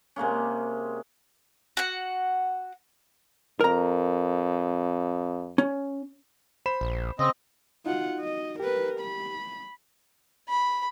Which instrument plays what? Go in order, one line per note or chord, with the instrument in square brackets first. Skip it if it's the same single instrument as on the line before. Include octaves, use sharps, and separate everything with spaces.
[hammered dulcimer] C3 G#3 A#3 C#4
[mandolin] F#4 F#5
[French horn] F2 [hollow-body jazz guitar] A#4 A#5
[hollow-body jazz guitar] C#4
[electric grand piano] C5 B5 E7
[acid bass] A#1
[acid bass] C#3 [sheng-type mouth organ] C4 D#5
[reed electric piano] D#4 F#4 [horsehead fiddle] F4 F#5
[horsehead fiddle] D#5
[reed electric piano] G4 [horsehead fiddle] A#4 B4
[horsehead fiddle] B5
[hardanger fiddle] B5